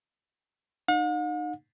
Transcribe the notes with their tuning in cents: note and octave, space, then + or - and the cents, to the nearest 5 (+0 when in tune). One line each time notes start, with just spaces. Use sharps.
D#4 -30 F#5 -45